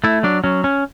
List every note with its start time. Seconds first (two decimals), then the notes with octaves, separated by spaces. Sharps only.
0.04 A3 E4
0.23 F#3 D4
0.44 F#3 C#4
0.64 C#4